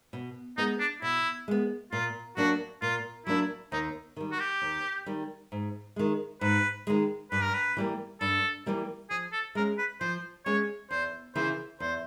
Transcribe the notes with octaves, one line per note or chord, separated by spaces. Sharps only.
B2
G#3 B3 D#4
D4
B2 E4
G#3 B3
A#2 F4
F#3 A#3 D4 F#4
A#2 F4
F#3 A#3 D4 E4
D#2 D#4
D#3 G3
F#4
G4
D#2
D#3 G3
G#2
D#3 G#3
G#2 B4
D#3 G#3
G2 B4
A#4
B4
E3 G3 A#3
G2 A4
E3 G3 A#3
F3 G#4
A4
G#3 C#4 A#4
B4
F3 C5
G#3 C#4 C#5
E2 C5
C#3 E3 C5
E2 C5